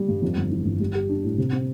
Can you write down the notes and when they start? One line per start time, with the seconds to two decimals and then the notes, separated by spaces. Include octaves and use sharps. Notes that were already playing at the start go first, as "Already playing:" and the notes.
Already playing: G3
0.08 G2
0.22 F2
0.37 G1
0.51 E3
0.65 G1
0.80 G3
0.95 G4
1.09 D4
1.24 A2
1.38 C3
1.52 C4